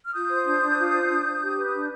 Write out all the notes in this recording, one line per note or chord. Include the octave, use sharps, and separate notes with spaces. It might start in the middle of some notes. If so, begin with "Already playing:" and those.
F6
F4 D#6 G6
C5
D4
D4
F4
C5
D4
D4
G4
B4
D4